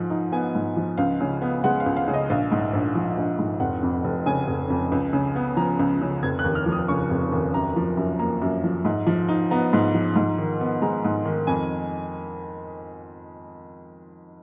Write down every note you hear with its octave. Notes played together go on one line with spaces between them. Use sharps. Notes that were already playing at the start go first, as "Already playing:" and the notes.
Already playing: G#2 F3
D#4
B3 G#5
G#2
F3
C#2 F5
C#3
B3
G#3 F#5
F5
C#2
F5
C#3
D#5
A#1 F5
G#2
A#1
F3
A#1
G#2
F1 F#5
F2
F1
C#3 G#5
F1
F2
C#2
C#3
B3
F3 A#5
C#2
C#3
F1 G#6
F#6
D#2
F6
F3
D#6
C#3 C#6
F1
D#2
F#2 A#5
F3
F#2
A#3 A#5
F#2
F3
G#2
F3
D#4
B3 A#5
G#2
F3
G#2
D#3
B3
G#3 A#5
G#2
D#3
F2 G#5